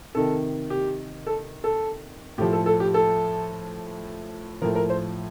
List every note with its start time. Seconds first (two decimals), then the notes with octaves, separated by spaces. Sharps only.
0.15 C3 D#3 A4
0.70 G4
1.26 A4
1.64 A4
2.38 A2 G4
2.41 F3
2.52 A4
2.66 A4
2.80 G4
2.94 A4
4.61 F3 A#4
4.64 A2
4.75 A#4
4.90 C5